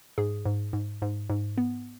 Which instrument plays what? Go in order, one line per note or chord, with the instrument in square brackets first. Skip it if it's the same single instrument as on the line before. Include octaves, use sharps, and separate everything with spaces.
[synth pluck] G#2 G#4
G#2
G#2
G#2
G#2
B3